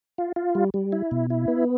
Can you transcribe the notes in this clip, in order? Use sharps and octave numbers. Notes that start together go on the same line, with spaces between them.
F4
F4
G3
G3
E4
B2
E4
B3